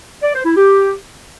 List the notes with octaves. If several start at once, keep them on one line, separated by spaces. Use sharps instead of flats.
D5
C5
E4
G4